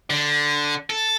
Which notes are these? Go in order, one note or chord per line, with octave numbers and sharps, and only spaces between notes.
D3
A4